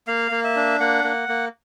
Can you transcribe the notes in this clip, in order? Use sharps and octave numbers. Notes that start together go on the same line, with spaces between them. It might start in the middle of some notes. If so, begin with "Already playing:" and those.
A#3 F5
A#3
E5
D4
A#3 F#5
A#3
A#3